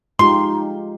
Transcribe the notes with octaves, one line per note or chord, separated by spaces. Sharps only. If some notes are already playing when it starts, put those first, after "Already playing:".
G#3 D#4 F4 G4 C6